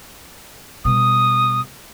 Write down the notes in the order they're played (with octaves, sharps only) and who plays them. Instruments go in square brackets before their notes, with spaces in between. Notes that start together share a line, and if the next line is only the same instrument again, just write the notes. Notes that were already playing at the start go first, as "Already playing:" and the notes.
[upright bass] B2 G3 [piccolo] D#6